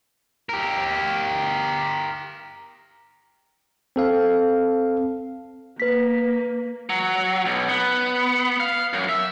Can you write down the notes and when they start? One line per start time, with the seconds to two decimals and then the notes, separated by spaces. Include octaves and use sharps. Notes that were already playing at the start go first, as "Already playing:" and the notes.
0.49 G4 A#4
3.96 C4 A4 F5
5.80 A#3 B4 B6
6.89 F#3
7.46 B1
7.68 B3
8.60 F5
8.93 F#2
9.09 E5